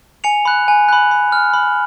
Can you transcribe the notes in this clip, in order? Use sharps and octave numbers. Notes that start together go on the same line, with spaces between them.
G#5 C#7 F7
B5 F#6
G#5
B5 F#6
B5
F6
B5